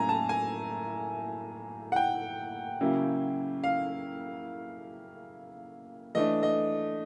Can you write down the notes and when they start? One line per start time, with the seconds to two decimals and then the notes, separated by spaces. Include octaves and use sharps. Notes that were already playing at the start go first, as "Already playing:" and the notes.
Already playing: A2 F#3 A#3 C#4 E4 G#5 A#5
0.09 A5
0.29 G#5
1.92 F#5
1.96 G5
2.81 C#3 F#3 A#3 C#4 E4
3.64 F5
6.15 E3 A3 D4 D#5
6.43 D#5